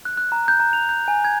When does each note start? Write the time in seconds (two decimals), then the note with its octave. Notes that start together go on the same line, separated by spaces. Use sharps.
0.05 F#6
0.17 F#6
0.32 A#5
0.48 G6
0.60 A#5
0.73 F7
0.89 G6
1.08 G#5
1.25 G#6